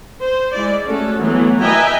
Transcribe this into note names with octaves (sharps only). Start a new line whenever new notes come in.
C5
G#3 E4 D5
A3 C#4 F#4 A4
E3 F#3 A3 B3
B4 D#5 E5 G5 G#5 A#5